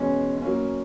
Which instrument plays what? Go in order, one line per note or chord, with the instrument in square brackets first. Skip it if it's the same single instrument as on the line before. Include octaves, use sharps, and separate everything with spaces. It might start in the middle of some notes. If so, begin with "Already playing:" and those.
Already playing: [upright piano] E2 B2 G#3 [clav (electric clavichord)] C#4
[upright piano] F#3 A#3 C#4